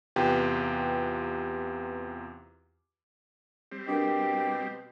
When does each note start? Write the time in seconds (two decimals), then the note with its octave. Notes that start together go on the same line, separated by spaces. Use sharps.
0.16 E2 C3 F4 G4 B4 G5
3.72 G3 C4
3.88 B2 D4 G4 A#4